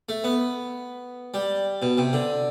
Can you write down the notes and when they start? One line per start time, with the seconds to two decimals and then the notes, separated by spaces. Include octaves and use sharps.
0.09 A3
0.24 B3
1.34 G3
1.82 B2
1.98 C3
2.13 D3